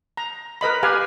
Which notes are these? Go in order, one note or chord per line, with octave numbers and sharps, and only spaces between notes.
A#5
A#4 B4 D#5 B5
G4 B4 F5 G#5